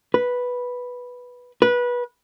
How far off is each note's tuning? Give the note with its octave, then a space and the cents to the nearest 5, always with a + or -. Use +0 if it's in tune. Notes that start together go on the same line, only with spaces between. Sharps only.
B4 -5
B4 -20